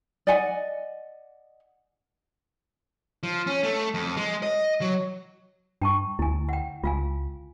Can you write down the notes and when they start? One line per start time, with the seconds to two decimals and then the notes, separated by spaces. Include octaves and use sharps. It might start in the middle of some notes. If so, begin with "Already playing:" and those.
0.27 D5 D#5 F#5 G#5
3.23 F3
3.47 C#4
3.63 A3
3.94 F2
4.17 G#3
4.43 D#5
4.81 F#3
5.82 G2 G5 A5 C#6
6.19 D2 E4 G#5
6.49 F#5 G5
6.84 C#2 F4 F5 G#5